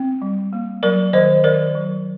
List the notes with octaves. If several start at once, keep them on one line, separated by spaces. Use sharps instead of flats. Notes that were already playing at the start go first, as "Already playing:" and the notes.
Already playing: C4
G3
A#3
F#3 A#4 D5
D#3 C5 D#5
D#3 A#4 D5
F#3